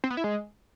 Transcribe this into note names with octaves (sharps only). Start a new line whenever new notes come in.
C4
B3
E4
G#3